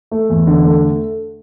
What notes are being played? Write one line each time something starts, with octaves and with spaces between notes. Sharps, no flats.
A3
E2
D3
A3